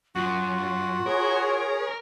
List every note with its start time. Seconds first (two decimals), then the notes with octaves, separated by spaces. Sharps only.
0.16 F#2 F4 F#4
1.06 G#4 A#4 C#5